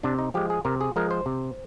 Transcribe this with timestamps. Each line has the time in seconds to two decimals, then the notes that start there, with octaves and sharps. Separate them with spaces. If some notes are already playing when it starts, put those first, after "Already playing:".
0.03 C3 D4
0.18 D#4
0.34 F3 G#3 G4
0.50 G#4
0.65 C3 A#4
0.81 G#4
0.96 F3 G#3 A#4
1.11 C5
1.26 C3